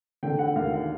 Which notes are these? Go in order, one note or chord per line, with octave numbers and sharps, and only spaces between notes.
D3 G5
F#5
D#2 F5
F5